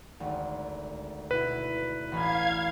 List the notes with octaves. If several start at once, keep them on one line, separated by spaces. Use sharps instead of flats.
G#1 D2
B2 E4 B4 E5
A1 F#4 F5 B5 G#6